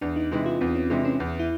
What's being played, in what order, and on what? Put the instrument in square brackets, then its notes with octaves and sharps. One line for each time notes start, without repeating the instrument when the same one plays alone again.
[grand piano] E2 [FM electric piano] D4
[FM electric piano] D#4
[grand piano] C3 E3 G#3 [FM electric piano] D#4
[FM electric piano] F4
[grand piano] E2 [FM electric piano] C4
[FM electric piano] C#4
[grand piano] C3 E3 G#3 [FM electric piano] D4
[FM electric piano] C#4
[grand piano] E2
[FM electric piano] E4